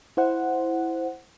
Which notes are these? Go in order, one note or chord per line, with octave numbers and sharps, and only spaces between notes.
E4 C5 F#5